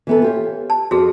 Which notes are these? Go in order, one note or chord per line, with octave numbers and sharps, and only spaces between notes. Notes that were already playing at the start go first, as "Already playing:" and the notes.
E3 B3 A4
F4 G4 C#5
A5
F2 F#4 G#4